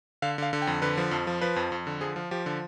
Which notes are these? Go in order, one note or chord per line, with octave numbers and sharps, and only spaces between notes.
D3 F5
D3 F5
D3
G5
F2
D3 B4
F3
F2
F3
F3 B4
F2
F2
D3
F3 G#4
F3
F3 G4
D3